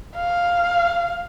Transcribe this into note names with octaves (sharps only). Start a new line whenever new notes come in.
F5